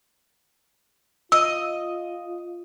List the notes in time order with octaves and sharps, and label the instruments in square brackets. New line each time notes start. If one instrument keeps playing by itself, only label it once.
[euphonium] F4 [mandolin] D#5 [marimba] E6